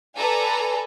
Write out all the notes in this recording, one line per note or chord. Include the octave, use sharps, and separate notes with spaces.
A4 B4 D5 G#5 A#5